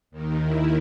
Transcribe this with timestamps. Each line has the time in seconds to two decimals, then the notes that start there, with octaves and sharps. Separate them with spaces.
0.11 D#2 D#3
0.42 E4